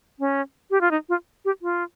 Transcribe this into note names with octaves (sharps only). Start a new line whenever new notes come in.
C#4
G4
F4
D#4
F4
G4
F4